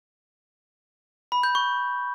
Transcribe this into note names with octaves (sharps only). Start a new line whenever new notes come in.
B5
G6
C#6